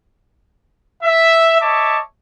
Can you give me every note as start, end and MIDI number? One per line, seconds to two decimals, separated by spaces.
1.03 1.60 76
1.61 1.99 73
1.61 1.99 75
1.61 1.99 76
1.61 1.99 81
1.61 1.99 85
1.61 1.99 86